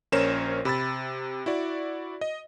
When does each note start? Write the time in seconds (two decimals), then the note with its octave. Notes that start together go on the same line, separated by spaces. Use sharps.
0.12 A#1 C#4 A#4 C5 C#5 E7
0.65 C3 B5 E6 A6
1.46 E4 F#4 D5
2.21 D#5